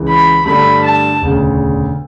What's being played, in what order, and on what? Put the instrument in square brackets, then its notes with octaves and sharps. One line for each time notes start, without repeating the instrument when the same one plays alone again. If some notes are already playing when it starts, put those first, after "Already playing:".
Already playing: [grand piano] C#2 C#3 E3
[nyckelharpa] B5
[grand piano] G2 D3 A3 D4 A4 [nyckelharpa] B5
[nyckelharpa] A5
[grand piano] E1 D2 C#3